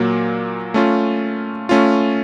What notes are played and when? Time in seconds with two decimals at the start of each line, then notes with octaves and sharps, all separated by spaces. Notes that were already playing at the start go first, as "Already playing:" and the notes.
Already playing: A#2 F#3 A#3
0.74 A3 C#4 F4
1.69 A3 C#4 F4